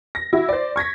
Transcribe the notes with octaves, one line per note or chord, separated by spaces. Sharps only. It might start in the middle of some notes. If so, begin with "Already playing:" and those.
A#6
E4 F#4
C5 D5
C#6 G#6 A#6 B6